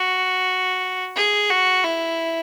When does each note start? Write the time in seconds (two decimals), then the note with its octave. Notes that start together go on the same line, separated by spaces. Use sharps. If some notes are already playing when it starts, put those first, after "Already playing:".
Already playing: F#4
1.16 G#4
1.50 F#4
1.84 E4